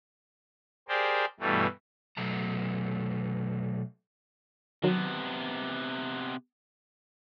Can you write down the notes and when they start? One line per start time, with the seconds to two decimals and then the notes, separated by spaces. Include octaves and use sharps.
0.89 G4 G#4 A#4 C5 D5
1.40 G2 B2 E3 G3 A3
2.17 B2 F#3 A3 A#5
4.83 C3 D#3 F#3 B3